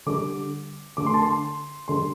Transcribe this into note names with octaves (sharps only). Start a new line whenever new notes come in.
D3 G3 D6
D3 A3 D6
C6
A5
C6
D3 G3 C6